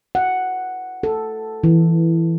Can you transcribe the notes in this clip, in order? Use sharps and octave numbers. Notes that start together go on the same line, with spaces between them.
F#5
A4
E3